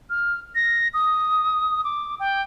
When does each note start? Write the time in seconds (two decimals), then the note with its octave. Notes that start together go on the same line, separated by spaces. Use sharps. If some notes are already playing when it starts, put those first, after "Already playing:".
0.10 F6
0.55 A#6
0.94 D#6
1.84 D6
2.20 G5